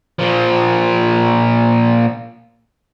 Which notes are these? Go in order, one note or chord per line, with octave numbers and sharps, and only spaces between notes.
A#2 F3